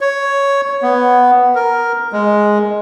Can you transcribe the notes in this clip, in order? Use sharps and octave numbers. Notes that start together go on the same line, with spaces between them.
C#5
B3
A#4
G#3